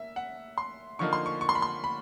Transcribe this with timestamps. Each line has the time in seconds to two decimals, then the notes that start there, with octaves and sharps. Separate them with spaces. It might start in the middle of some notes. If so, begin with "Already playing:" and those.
Already playing: A#3 E5
0.16 F#5
0.58 C6
0.99 D3 F3 A#3 D#4 C#6
1.13 C6
1.26 C#6
1.41 C#6
1.49 C6
1.55 B5
1.62 C6
1.84 B5